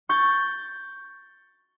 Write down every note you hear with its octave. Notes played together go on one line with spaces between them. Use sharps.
C#6 G6 A6